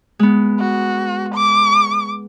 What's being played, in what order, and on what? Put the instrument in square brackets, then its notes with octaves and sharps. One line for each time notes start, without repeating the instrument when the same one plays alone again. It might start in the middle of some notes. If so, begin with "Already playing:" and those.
[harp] G#3 B3
[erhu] F#4
D6